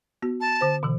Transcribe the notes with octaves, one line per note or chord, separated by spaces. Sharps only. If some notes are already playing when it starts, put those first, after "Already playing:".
B3 F#4
A5
D3 C5
B2 D3 E3